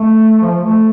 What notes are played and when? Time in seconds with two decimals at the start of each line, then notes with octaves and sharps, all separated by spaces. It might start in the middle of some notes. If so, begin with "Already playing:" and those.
Already playing: A3
0.42 F3
0.64 A3